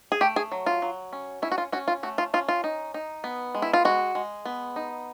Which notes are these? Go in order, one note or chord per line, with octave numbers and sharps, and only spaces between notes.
G#4
A3 G4
G#4
F#3
F4
F#3
C#4
C#4 E4
F#4
F4
C#4 F#4
F4
A3 F#4
F4
C#4 F4
F4
D#4
D#4
B3
G#3
E4
F4
G#3 F#4
G#3
B3
D#4